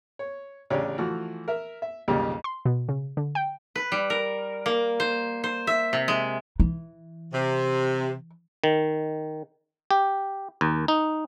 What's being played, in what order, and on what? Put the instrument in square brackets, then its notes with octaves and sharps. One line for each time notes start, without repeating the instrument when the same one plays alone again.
[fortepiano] C#5
A1 C#3 C#4 D4 G4
E3 F3 A3 F#4
A#4 E5
E5
B1 F2 C#3 G3 A#3 G4
[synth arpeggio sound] C6
B2
C#3
D3
G5
[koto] B4
G3
A#4
A#3
C5
C5
E5
C3
G#3
[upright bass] E3
[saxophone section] C3
[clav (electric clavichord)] D#3
G4
D#2
D#4